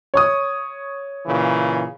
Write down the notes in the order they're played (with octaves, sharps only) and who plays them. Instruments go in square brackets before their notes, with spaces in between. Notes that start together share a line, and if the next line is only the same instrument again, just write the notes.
[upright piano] C#5 C#6 D#6
[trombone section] A#2 C#3 E3